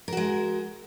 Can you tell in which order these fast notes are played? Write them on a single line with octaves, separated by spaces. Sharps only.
A#4 F#4 G#3